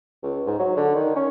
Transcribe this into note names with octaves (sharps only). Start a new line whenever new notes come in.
C#2
G#2
F#3
D3
D#3
C#4